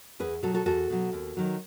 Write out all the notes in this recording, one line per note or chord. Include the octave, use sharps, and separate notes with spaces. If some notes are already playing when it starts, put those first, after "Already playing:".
E2 G#4 B4
B2 F#3 F#4 A4
F#4 A4
E2 F#4 A4
B2 F#3
D#2
D#3 F#3